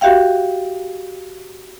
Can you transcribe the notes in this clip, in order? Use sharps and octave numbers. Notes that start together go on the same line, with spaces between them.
F#4 G4 E5 F5 G5